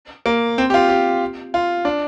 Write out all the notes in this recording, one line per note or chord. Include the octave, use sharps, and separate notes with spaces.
A#3
C4
G4
F4
G4
F4
D4